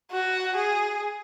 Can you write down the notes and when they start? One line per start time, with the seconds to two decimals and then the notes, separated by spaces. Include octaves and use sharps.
0.12 F#4
0.56 G#4